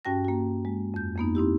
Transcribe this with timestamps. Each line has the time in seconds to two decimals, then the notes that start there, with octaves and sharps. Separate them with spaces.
0.05 G2 C#4 F#4 G5 A5 A#6
0.25 A#3 F#4
0.65 G#3
0.94 F2 G6
1.16 F2 A#3 B3 D#4
1.35 C4 D#4 E4 G4